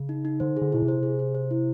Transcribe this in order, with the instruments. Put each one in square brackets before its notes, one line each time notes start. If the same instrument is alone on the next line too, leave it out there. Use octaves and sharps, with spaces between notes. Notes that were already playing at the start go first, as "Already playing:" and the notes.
Already playing: [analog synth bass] C#3
[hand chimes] D#4
D#4
[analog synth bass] D3 [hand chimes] C5
[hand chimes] G#4
[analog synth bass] D3
[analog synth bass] B2 [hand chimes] E4
[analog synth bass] C3
[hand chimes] C5
G#4
C5
C5
E4